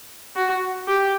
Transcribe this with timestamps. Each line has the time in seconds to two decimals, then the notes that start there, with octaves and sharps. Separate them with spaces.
0.36 F#4
0.88 G4